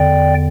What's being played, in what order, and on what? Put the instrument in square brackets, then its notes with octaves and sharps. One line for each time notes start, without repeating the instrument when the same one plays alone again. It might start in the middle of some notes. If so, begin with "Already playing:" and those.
Already playing: [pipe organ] E2 D3 D5 G5